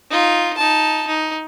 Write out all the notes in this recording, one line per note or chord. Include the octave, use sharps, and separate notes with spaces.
D#4 F4
D#4 A5
D#4